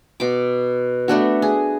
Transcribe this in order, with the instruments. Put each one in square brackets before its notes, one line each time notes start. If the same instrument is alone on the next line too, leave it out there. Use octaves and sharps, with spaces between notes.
[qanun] B2 D6
A3 B3 D4 F#4
G#4